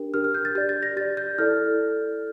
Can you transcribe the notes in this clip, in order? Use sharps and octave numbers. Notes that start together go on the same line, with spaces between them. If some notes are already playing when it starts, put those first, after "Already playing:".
Already playing: D4 G4 A#4
D4 G4 A#4 F6
F6
G6
A6
G4 D5 G6
A6
A#6
G4 D5 A6
G6
E4 A4 D5 F6